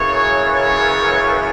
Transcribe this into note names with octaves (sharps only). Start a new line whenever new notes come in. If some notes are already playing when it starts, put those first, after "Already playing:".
Already playing: F#2 C#3 E3 C#5
C#5